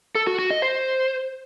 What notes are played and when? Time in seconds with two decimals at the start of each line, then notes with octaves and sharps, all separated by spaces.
0.15 A4
0.27 F#4
0.39 F#4
0.50 D#5
0.62 C5